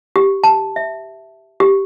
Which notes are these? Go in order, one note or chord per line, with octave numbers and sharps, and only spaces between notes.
G4
A5
E5
G4